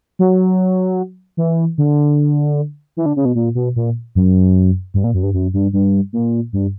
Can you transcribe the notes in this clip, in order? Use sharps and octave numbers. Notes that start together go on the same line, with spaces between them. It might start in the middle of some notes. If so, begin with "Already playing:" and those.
F#3
E3
D3
E3
D3
C#3
B2
A#2
B2
A#2
F#2
G2
A#2
F#2
G2
F#2
G2
G2
A#2
G2